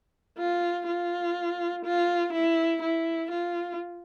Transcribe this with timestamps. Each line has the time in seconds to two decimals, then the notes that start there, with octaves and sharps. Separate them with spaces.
0.38 F4
0.87 F4
1.85 F4
2.33 E4
2.82 E4
3.31 F4